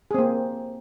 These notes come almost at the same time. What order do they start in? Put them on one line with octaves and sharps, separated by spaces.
G#4 C4 A#3